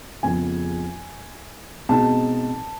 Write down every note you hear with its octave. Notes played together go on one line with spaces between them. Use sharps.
F2 C#3 F3 G#3 B3 G#5
B2 G#3 C4 D#4 A5